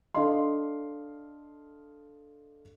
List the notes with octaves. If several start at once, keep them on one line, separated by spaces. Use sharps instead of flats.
D4 A4 D#5 F5 C6